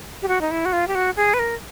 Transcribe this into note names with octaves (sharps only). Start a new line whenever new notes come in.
G4
F#4
D#4
E4
F#4
F4
G4
F#4
G#4
B4
A#4